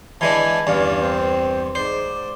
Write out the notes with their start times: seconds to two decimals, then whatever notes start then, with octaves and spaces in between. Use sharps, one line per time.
0.21 E3 G#3 D4 E4 G#5 A5
0.67 E2 G2 C#4 D4 F5
1.01 C4 C5
1.75 G#2 C5 D5